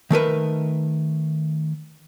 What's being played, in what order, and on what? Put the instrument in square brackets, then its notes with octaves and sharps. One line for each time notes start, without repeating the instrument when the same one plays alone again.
[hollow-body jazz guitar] D#3 A3 A#4 B4